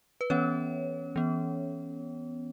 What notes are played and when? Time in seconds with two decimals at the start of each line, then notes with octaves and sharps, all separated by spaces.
0.21 B4
0.30 E3 B3 C#4 C#5
1.16 E3 B3